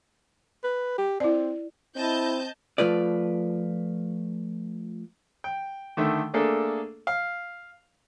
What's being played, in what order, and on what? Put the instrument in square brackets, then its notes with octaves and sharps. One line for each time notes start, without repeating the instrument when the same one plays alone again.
[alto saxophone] B4
G4
[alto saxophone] C4 [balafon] E4 D5
[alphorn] C4 [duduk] E4 [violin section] D#5 A5 G6
[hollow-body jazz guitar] F3 A3 F4 B4 D5
[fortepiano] G5
D3 D#3 A3
A3 A#3 D4 G#4 A4
F5